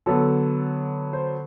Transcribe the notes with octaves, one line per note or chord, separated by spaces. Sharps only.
D3 F#3 B3 A4
C5